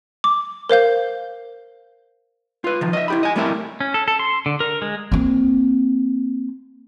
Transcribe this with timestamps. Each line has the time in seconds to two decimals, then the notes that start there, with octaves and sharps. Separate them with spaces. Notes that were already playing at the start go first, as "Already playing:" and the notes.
0.24 D6
0.69 A#4 C5 F5 G6
2.64 F4 B4
2.81 D#3 F3
2.93 D#5 E5
3.08 E4 G4 B5
3.23 D#5 G#5
3.36 G3 A3 C4 E4 A#4 E5
3.80 C#4
3.94 A4
4.08 A4
4.19 C6
4.46 D3
4.60 A#4
4.82 G#3
5.12 A#3 C4